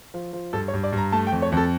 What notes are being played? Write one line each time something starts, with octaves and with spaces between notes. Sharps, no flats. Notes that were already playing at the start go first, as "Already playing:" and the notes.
F3
F3
G2 A4
C#5
G2
D5
G2 A#5
A3 A5
G5
F2
C#5
F2 A4